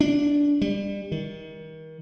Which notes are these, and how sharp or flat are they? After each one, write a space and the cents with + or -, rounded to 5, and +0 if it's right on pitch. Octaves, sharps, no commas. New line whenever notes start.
D4 -15
G3 +30
D#3 +30